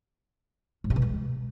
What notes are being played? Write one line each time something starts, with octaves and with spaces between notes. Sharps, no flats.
G#2
C3
B2
G#3